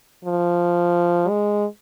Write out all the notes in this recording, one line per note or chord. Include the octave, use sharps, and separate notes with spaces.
F3
G#3